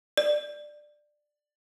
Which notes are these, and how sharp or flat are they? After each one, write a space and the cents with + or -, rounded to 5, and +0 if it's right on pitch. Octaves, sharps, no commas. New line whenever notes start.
D5 +15